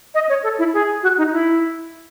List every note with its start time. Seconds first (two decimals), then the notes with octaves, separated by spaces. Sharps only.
0.14 D#5
0.29 C#5
0.43 A4
0.59 E4
0.74 G#4
1.03 F#4
1.18 D#4
1.32 E4